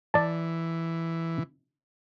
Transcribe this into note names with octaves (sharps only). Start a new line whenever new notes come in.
E3 D5 A5